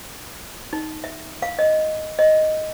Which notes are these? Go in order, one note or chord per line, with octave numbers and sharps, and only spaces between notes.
D#4
E5
F5
D#5
D#5